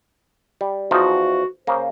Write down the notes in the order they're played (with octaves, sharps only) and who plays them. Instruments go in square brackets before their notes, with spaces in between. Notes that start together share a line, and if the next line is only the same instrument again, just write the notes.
[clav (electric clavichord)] G3
[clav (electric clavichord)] E2 F3 D#4 [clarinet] F#4
[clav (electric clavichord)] C#3 A#3 [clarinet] C5